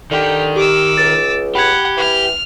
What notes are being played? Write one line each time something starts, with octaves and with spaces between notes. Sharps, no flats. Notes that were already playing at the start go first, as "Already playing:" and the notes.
D3 D#3 G4
G4 D6 E6
C#2 A6
G4 F#5 B5 G#6
E3 F6